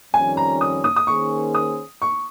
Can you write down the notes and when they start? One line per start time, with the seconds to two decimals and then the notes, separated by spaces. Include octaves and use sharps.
0.13 F2 D#3 G3 C#4 G#5
0.37 A#5
0.61 D#6
0.84 D#6
0.96 D#6
1.07 D#3 A#3 C#4 G#4 C5 C#6
1.55 D#6
2.02 C#6